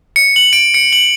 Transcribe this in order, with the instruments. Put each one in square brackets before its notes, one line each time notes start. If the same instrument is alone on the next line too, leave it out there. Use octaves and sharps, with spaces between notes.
[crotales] C#7
F#7
D7
C#7
F#7